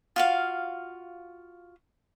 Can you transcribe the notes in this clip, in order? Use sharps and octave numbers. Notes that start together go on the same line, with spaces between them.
F4 F#4 F5